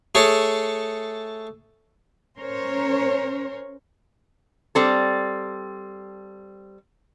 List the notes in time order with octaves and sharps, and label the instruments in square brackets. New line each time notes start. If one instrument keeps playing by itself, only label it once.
[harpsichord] A3 G#4 A4 C#5
[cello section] C#4 A#4 C5 C#5
[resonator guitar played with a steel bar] G3 C4 A4